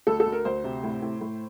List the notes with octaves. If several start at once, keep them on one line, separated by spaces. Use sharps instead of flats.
D2 A4
A4
D2
A#4
D2 C5
C3
A2
A2
A2